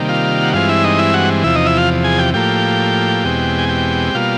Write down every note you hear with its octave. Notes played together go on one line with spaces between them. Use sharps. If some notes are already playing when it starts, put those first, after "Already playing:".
Already playing: C3 D#3 G3 A#3
F4 F5
F#5
G2 E3 G#3 C4 F4 F5
E4 E5
D#4 D#5
E4 E5
F#4 F#5
E2 C3 F3 E4 E5
D#4 D#5
E4 E5
F4 F5
G#4 G#5
G4 G5
A2 F3 A#3 G4 G5
E2 B2 G#3 C4
G#5
G4 G5
B2 G3 A#3 F4 F5